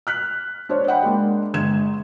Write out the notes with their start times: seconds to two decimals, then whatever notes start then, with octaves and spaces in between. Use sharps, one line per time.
0.07 F6 F#6 B6
0.69 D4 C5 C#5
0.87 D#5 F#5 G5 B5
1.03 G#3 A#3 D4
1.54 G1 G#3 G#6 E7